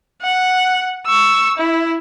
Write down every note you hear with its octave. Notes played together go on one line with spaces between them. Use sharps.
F#5
C#6 E6
E4